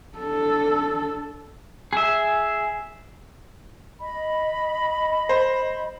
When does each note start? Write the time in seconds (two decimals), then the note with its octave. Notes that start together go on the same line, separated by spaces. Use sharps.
0.18 D4 A4
1.93 G#4 E5
4.01 D#5 B5
5.29 C5